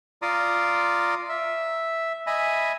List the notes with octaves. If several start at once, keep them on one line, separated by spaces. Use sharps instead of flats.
F4 D5 A#5 C6 D#6
E5
D#5 E5 G#5 B5